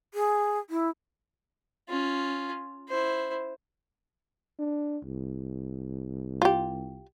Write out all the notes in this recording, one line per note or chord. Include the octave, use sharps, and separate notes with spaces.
G#4
E4
C#4 F4
E4 C5
D4
C2
F4 G4